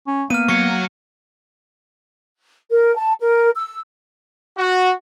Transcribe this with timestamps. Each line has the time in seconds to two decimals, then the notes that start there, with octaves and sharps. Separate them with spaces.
0.07 C#4
0.30 A#3 B3 F6 D#7
0.49 F#3 F#5 C#6
2.71 A#4
2.96 A5
3.19 A#4
3.56 E6
4.58 F#4